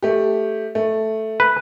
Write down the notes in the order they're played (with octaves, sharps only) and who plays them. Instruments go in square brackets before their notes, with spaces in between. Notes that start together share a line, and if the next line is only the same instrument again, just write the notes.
[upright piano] A3 G4
A3
[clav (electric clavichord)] B4